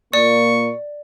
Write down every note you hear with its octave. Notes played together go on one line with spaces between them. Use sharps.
A#2 A#3 D5 C#6